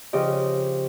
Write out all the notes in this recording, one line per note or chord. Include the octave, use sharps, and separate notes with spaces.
C#3 F3 G4 D#5